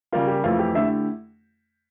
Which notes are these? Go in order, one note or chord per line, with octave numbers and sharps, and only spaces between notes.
C#3 G3 A#3 F4
G4
F2 E3 A3 F4
G4
D3 A3 E4 G4 E5